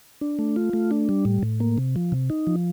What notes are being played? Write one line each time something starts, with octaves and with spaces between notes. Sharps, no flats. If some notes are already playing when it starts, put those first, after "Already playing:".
D4
A3
F4
A3
D4
G3
A2
A2
A#3
C3
F3
C3
D#4
F3